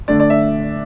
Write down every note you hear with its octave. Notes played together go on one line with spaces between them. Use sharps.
D3 A3 D4 D5
D5
E5